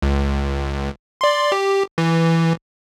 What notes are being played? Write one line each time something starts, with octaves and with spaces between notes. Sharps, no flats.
C#2
D5 C6
G4
E3